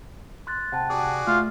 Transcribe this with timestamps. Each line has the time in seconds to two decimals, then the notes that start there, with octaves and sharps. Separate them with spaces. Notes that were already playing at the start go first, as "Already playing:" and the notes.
0.47 C6 F#6 A6
0.72 C3 F#5 G5 A5
0.90 F#4 G#4 D5 D#6
1.27 A3 F4